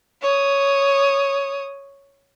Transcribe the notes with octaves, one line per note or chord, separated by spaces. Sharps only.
C#5 D#6